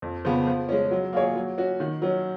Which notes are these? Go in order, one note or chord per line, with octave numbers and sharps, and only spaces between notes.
F2
C#3 F3 B3
F3
G#3 C#4
F#3
A#3 F4 G#4 C#5
F#3
C#4 F#4
D#3
F#3 C#4